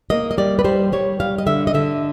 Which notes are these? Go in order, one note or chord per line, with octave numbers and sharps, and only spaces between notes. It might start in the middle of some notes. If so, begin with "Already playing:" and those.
A#3 D#5
D#5
G3 D5
B4
G3 C5
G3 C#5
G3 F5
D#5
D3 E5
D#5
D3 E5